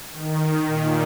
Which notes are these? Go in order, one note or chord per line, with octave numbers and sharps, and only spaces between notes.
D#3
A#2